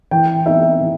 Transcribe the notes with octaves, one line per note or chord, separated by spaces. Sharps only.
E3 G5
B3 D#4 E5
E3